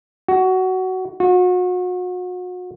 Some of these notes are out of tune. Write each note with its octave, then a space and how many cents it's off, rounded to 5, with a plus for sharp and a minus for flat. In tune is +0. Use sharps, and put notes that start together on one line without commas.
F#4 +15
F#4 -35